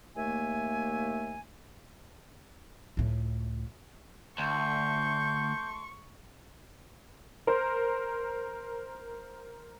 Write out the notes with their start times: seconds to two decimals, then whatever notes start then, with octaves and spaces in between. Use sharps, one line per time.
0.17 D#2 A3 A#3 E5 G#5
2.97 C#2 A2
4.38 D2 A3 C6 C#6 G6
7.47 A#4 C5